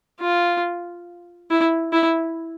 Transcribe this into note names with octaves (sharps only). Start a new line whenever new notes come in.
F4
E4
E4